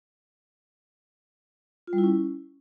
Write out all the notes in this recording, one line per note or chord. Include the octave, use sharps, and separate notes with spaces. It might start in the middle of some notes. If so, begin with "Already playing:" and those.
F4
G3
E4
C#4